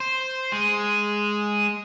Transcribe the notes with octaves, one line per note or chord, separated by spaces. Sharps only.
C5
G#3